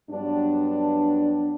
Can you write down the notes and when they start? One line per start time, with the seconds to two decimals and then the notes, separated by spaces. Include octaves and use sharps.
0.11 G2 F#3 B3 D4